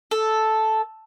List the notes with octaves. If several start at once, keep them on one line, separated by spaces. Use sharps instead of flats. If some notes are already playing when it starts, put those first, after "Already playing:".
A4